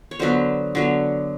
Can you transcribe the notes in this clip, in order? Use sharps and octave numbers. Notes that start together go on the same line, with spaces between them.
C#5
D3 F#3 B3 C5
D3 F#3 B3